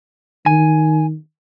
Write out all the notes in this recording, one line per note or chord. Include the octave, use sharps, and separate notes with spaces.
D#3 G#5